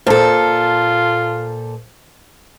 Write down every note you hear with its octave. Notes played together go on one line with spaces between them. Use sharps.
A#2 F4 A4 C5 A5